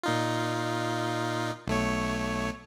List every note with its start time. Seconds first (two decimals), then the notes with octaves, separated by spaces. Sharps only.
0.03 A#2 D#4 F4
1.67 B1 A3 C#5